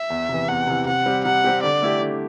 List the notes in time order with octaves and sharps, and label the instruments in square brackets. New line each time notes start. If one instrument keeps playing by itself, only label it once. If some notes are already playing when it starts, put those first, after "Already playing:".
Already playing: [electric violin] E5
[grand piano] E2
C3 E3
[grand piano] E2 [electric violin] F#5
[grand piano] C3 E3
[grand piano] C3 [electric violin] F#5
[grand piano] G3 C4 G4
[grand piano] C3 [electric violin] F#5
[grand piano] G3 C4 G4
[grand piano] D3 [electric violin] D5
[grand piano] A3 E4 G4
D3